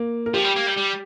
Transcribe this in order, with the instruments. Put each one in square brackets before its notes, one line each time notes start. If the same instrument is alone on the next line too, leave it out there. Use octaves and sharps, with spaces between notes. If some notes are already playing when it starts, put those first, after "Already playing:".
Already playing: [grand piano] A#3
A#4
[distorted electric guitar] F3 [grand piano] G4
[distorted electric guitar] G3
A#3
G3
G3